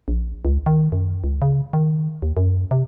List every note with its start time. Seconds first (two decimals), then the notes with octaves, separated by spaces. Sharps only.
0.08 A#1
0.45 C#2
0.66 D#3
0.92 F#2
1.24 C#2
1.42 C#3
1.73 D#3
2.22 D#2
2.37 F#2
2.71 C3